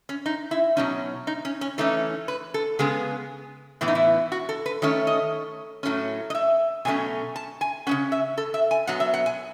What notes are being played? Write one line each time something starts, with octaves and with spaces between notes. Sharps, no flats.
C#4
D#4
E4
B2 F#3 C#4 D#4
D#4
C#4
C#4
E3 A3 C#4 D#4
B4
A4
C#3 G#3 B3 G#4
A2 E3 B3 E4
D#4
E4
F#4
A4
B4
D#3 A3 C#4 C#5
D#5
A2 F#3 A3 C#4
D#5
E5
B2 F#3 A3 C#4 G#5
A5
G#5
C#3 G#3 C#4 F#5
E5
A4
E5
G#5
B2 F#3 B3 F#5
E5
F#5
G#5